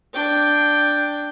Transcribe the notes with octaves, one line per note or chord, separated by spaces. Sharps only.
D4 G5